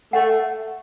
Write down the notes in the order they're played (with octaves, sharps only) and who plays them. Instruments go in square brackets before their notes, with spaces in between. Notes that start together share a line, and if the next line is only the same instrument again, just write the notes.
[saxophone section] A3 [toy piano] F#5